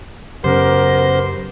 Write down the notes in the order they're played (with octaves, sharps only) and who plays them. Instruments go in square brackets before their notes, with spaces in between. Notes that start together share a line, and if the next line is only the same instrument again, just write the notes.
[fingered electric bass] F#2 [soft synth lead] C#3 [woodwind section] B3 G4 A#4 [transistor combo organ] C5